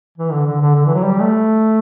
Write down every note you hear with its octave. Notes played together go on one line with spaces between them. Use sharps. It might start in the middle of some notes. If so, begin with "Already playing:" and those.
E3
D3
D3
D3
D3
E3
F#3
G3
A3